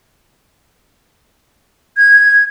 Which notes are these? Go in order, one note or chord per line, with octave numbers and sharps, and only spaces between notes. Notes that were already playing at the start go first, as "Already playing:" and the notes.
G#6